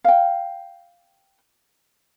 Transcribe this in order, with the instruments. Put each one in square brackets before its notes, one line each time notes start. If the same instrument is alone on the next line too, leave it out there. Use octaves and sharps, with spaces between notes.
[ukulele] F5 G5